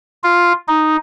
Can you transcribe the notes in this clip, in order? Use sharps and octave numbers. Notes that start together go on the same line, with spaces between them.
F4
D#4